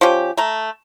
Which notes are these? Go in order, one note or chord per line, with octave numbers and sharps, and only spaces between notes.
F3 C#4 G4
A3 A#5